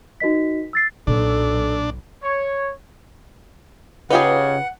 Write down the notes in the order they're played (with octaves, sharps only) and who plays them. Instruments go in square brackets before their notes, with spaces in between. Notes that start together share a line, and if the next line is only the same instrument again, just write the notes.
[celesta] D#4 F#4 A#4 D#5 B6
E6 A6 C7
[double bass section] B1 [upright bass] A#2 [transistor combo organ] D4 [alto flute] A4
[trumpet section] C#5
[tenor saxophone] C#3 [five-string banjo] D#4 G4 G#4 [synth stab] F4 B4 [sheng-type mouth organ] F#5